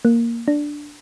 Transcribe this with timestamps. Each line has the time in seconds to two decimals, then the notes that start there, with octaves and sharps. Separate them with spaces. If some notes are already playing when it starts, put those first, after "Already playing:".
0.05 A#3
0.48 D4